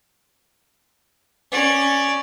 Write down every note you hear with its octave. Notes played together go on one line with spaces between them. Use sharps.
C#4 D5